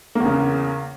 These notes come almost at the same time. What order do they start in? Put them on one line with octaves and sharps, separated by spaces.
A#3 E2 C#3